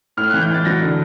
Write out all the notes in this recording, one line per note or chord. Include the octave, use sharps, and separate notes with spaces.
A2 F6
E3 F#6
G6
E3 A6
F#3 A#6
D3